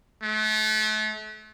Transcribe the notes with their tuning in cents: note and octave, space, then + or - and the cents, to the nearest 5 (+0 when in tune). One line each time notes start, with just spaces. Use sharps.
A3 -35